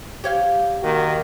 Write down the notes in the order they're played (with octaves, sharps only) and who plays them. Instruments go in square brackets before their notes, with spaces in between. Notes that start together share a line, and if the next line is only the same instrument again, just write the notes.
[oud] G4 C#5 F5
[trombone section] D#3 A#3 F#4